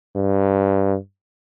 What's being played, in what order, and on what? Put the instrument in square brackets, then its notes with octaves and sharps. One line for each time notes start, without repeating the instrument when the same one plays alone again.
[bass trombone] G2